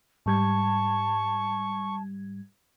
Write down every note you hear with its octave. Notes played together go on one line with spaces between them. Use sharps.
G#2 G3 A5 C#6 G#6